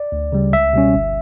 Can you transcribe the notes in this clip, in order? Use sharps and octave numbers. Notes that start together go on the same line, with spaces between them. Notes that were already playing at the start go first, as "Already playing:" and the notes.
Already playing: D5
D2
C#3 G3
C#2 E5
B2 G3 C#4
G1